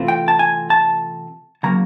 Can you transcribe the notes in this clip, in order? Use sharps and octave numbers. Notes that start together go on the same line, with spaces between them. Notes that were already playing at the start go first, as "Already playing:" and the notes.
Already playing: C3 E3 A3 C4 F4
G5
A5
G#5
A5
C#3 F#3 A#3 A#5